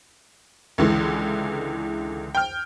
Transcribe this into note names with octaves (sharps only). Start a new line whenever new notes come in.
C#2 D3 E3 G#3
G5 F6